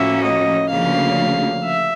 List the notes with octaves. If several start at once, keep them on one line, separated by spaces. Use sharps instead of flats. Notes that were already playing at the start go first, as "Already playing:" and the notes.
Already playing: A2 F3 A#3 C#4 F#4 E5
D#5
D2 C#3 F3 A#3 F5
E5